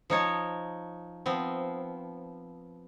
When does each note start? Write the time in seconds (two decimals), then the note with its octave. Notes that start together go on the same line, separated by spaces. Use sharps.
0.10 F3 D#4 C#5 A5
1.26 F3 B3 C4